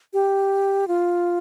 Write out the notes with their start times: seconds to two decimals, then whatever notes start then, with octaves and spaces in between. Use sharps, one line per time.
0.13 G4
0.88 F4